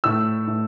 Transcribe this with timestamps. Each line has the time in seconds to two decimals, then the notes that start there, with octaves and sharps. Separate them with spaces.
0.04 A2 A3 E6
0.47 A2 A3